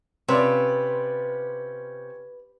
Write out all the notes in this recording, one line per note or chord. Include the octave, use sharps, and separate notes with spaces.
C3 C#4 F4 B4 D5